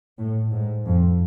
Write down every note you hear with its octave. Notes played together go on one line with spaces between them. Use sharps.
A2
G#2
F2